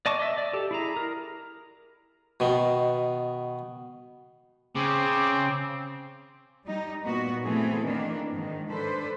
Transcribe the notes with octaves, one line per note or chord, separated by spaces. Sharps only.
D5 D#5 A5 C#6 D6
D#5 E5
D5
G4 A4
E4 G#4 A#5
A#4
B2 D#3
C#3 C4 D6
G3 D#4
A#2 B3 F#4
E3 A3 C4 G#4 A4
D#3 E3 A#3 D4
G#2 D#3
D4 A4 B4 C5